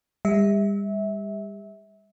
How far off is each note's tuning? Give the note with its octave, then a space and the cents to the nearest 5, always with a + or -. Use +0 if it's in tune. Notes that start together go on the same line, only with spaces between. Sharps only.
G3 +40 E5 -25